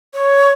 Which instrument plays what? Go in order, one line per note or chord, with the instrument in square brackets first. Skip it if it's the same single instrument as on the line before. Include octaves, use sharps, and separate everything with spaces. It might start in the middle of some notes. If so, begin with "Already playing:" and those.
[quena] C#5